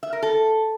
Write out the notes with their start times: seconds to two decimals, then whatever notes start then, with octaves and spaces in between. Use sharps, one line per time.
0.03 E5
0.13 A#4
0.23 A4